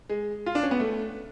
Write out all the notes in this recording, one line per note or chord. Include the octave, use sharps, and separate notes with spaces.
G#3
F4
D4
C#4
B3
A3